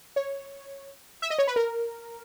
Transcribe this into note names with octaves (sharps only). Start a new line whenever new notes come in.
C#5
E5
D#5
C#5
B4
A#4